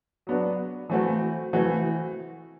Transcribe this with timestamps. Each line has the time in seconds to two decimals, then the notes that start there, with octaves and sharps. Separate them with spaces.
0.27 F#3 B3 D4 F#4
0.90 E3 A3 C4 F#4
1.53 E3 A3 C4 F#4